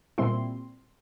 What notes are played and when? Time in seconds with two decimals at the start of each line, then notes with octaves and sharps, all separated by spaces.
0.18 A#2 G3 C4 E4 C6